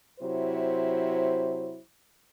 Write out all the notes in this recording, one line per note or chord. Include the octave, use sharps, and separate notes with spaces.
C3 F#3 E4 C5